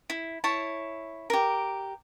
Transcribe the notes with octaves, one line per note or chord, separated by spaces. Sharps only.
E4
E4 C#5 A5
G4 A#4